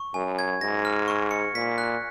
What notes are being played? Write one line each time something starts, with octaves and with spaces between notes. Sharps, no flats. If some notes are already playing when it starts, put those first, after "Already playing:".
Already playing: C#6
F#2 G#5
G#6
G#2 A#6
F6
C#6
C#7
A#2 B6
F#6